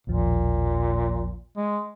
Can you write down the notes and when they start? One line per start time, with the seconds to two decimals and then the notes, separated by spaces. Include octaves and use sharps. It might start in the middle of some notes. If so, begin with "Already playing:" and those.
0.07 A1 D#2 A#2 F3
1.57 G#3